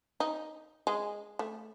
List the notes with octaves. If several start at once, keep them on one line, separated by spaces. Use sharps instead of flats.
D#4
G#3
A3